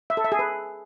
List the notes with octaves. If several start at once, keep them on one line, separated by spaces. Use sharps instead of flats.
E5
A4
E5
G#4
B4